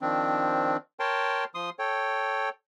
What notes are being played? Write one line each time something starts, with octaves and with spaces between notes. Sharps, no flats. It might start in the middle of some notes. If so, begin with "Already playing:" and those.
D#3 F3 C4 D4
A#4 C#5 G5 A5 C6
F3 C6 D#6
A4 C#5 G5